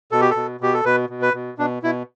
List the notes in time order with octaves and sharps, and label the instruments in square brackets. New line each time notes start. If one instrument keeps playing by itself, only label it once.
[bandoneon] B2 A4
G4
B2 A4
B2 G4
A4
B2 B4
B2
B4
B2
B2 D4
B2 E4